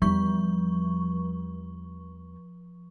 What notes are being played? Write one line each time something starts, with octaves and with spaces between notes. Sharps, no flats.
E2 F3 G3 C#6